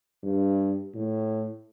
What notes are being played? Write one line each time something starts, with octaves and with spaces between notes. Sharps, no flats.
G2
A2